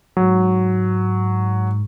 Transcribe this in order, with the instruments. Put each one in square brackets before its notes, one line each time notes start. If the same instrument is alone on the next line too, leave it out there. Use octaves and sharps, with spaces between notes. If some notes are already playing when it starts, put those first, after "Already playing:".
[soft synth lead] G#2 [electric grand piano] F#3